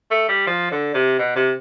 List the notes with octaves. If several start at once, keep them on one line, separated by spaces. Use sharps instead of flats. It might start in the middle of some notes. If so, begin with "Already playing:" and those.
A3
G3
F3
D3
C3
B2
C3